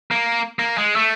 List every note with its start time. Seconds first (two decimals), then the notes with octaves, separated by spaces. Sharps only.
0.11 A#3
0.59 A#3
0.78 G#3
0.96 A3